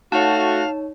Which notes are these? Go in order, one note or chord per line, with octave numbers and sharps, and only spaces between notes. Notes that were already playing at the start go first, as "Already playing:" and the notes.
A3 D#4 F#4 C#5 F5 A5